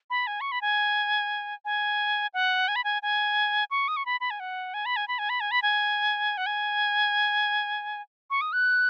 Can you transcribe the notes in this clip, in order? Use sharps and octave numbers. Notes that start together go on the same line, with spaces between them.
B5
G#5
C#6
B5
G#5
G#5
F#5
G#5
B5
G#5
G#5
C#6
D#6
C#6
B5
B5
G#5
F#5
G#5
B5
G#5
B5
G#5
B5
G#5
B5
G#5
F#5
G#5
C#6
D#6
F#6